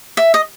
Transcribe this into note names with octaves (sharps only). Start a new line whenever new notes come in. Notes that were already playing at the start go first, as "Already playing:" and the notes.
E5
D#5